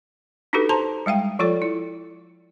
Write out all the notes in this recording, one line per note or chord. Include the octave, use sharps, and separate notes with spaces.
D4 D#4 F#4 G4 A4 B4
C5 A5 A#5 C6
G3 G#3 F5 G5
F3 F4 A4 C#5 D5
E4